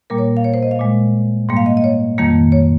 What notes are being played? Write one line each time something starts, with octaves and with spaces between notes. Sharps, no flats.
A#2 G3 A#3 A#4
C#5
F5
C#5
C5
D#5
F5
A#2 G#3
G#2 G3 A#3
F5
D#5
D#5
C#5
F2 D#3 G3 A#3
C#5